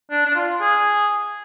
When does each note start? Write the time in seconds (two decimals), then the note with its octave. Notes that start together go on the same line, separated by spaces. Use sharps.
0.11 D4
0.26 D4
0.35 F4
0.61 G#4